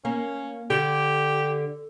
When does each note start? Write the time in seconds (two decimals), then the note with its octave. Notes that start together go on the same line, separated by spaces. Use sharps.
0.05 A#3 C#4
0.70 D3 G4